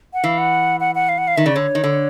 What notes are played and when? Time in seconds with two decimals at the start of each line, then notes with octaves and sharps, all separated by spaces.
0.14 F#5
0.24 E3 F5
0.38 F#5
0.80 F#5
0.95 F#5
1.09 F5
1.18 F#5
1.28 F5
1.37 D#3 E5
1.46 C#3 D5
1.55 D3 C#5
1.75 D#3
1.84 D3